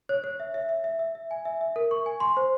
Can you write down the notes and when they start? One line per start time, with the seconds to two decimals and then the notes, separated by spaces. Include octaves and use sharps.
0.09 C#5
0.24 C#5
0.40 E5
0.54 E5
0.69 E5
0.84 E5
0.99 E5
1.15 E5
1.31 G#5
1.45 E5
1.61 E5
1.76 A#4
1.91 C#6
2.06 G#5
2.20 C6
2.37 C5